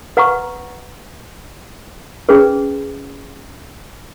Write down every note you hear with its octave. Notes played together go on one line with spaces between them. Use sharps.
B4 F#5 A#5 C#6
C#4 G#4 B4